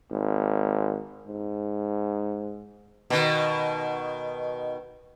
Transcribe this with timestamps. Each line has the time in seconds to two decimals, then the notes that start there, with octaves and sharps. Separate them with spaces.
0.11 G#1
1.27 G#2
3.10 B2 D#3